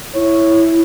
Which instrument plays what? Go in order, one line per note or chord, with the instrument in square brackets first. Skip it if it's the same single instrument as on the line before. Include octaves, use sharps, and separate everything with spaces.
[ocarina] E4 [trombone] C#5